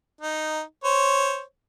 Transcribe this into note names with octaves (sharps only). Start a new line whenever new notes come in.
D#4
C5 C#5